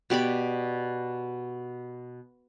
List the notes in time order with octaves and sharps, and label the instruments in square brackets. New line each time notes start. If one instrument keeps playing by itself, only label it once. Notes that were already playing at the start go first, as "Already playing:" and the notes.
[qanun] B2 G4 D5 B5